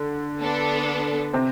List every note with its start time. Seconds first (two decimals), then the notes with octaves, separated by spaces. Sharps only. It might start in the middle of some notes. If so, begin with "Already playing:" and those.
Already playing: D3
0.41 B3 D4 A4
1.33 C3 C4